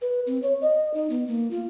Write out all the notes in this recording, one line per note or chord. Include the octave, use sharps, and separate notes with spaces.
B4
C4
C#5
D#5
D#4
B3
A#3
F4